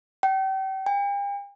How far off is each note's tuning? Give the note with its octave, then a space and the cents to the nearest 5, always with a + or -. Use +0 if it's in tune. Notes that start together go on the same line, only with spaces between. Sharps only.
G5 -35
G5 +45